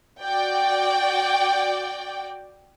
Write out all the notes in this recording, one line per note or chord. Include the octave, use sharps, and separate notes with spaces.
F#4 D5 G5